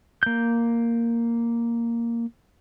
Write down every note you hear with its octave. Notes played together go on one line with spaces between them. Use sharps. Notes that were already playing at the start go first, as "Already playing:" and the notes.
A#3 G6